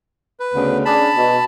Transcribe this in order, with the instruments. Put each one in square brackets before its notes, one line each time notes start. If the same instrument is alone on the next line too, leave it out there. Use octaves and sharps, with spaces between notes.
[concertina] B4
[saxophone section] D2 C#3 B3
[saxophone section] C#4 D4 G#4 [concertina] A5 B5
[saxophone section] B2